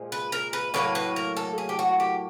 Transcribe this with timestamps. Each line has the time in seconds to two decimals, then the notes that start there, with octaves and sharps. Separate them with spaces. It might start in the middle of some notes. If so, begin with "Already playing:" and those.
Already playing: A#2 F3 G#3
0.12 B4
0.32 A#4
0.53 B4
0.74 A2 F#3 A#3 B4
0.95 B4
1.16 A#4
1.37 A4
1.58 G#4
1.69 G4
1.79 F#4
2.00 G4